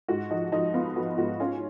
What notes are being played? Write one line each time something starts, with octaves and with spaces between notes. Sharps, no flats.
G#2 F#4
F3 D#4
F3 D#4
B3 F4
F3 F#4
G#2 F#4
C#4 F4